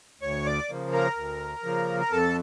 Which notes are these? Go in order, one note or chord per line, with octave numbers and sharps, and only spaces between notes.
D2 C#5 C#6
D5 D6
C#3 F3 A#3
A#4 A#5
D2
C#3 F3 A#3
A#5
F2 A4 A5